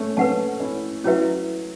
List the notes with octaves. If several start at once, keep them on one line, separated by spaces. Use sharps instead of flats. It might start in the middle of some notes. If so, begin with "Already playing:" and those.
Already playing: A3 C#4
A3 C#4 B4 F#5 A5
C#4 E4
F#3 C#4 E4 B4 E5